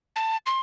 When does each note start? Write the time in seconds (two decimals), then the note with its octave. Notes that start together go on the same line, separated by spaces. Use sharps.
0.16 A5
0.46 C6